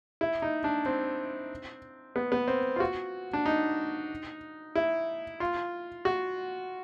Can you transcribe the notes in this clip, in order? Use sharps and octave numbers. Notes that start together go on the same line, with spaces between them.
E4
D#4
D4
C4
B3
B3
C4
F4
F#4
D4
D#4
E4
F4
F#4